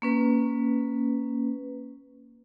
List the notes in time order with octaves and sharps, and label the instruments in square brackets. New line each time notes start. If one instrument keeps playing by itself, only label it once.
[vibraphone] A#3 C#4 B4